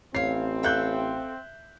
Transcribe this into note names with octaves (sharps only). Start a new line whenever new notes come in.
A1 C4 C#5 F5 C7
A4 E5 F5 G5 F#6 G6